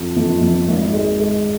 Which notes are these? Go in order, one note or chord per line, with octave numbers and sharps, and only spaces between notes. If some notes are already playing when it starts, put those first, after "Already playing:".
Already playing: F2 F3
F2
F2
G#1
G#3
G#3